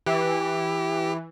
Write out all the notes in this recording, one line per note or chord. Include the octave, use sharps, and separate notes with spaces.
E3 G4